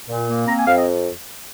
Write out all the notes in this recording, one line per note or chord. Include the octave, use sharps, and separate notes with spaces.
A#2
A#3
C4 A#5
G#5
F2 F5
D#5